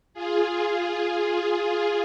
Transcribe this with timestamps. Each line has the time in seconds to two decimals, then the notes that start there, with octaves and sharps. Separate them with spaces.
0.14 F4 G#4
0.87 F4 G#4